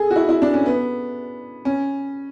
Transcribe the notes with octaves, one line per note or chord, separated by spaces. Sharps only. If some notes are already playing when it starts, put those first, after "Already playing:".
Already playing: G#4 A4
F#4
E4
E4
D4
C#4
B3
C#4